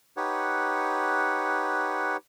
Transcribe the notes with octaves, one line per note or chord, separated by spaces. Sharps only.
D#4 G4 B4 C#5 F#5